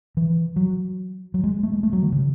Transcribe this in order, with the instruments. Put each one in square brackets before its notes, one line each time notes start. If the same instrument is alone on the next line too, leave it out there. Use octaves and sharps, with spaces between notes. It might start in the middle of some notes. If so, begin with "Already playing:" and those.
[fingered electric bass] E3
F#3
F#3
G#3
A3
G#3
A3
F#3
D#3
C#3